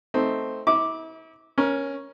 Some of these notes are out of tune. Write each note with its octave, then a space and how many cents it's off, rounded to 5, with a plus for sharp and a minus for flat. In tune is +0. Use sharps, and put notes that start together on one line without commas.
A3 +0 C4 +0 D#4 +10
E4 -40 D6 +0
C#4 +0 A#4 +20